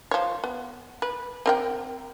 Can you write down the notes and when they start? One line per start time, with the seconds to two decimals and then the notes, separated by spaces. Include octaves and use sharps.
0.11 F3 C#5
0.44 B3
1.02 B4
1.46 C4 A#4 G5